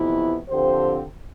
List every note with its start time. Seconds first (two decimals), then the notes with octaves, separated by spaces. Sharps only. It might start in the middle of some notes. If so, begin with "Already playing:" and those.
Already playing: F2 C3 E3 B3 E4
0.49 D3 F3 C4 G4 C5